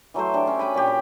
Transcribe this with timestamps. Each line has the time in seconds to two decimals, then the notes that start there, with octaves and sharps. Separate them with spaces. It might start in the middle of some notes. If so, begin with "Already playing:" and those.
0.14 E3 F#3 A3 C5
0.34 D4 G4
0.47 C#4
0.59 B4 G5 G#5 B5
0.74 A#2 C#4 G4
0.87 B5